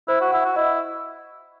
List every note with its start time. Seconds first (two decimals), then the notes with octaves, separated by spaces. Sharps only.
0.08 E4 C5
0.21 F#4
0.32 E4 F#5
0.45 F#4
0.56 E4 D#5